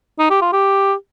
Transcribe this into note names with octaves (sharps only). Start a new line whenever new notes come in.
D#4
G4
F4
G4